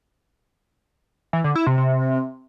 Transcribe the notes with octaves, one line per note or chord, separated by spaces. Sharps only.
E3
D3
E4
C3
C3